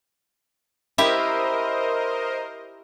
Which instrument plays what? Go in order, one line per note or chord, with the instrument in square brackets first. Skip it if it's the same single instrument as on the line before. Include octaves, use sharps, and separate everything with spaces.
[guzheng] E4 G4 [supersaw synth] A#4 C5 D#5